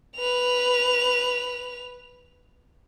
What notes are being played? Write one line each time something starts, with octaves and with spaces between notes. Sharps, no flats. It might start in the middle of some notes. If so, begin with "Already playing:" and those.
B4 F7